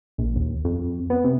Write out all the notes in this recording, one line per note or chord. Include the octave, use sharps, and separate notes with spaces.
A#1
D#2
F2
B3
C3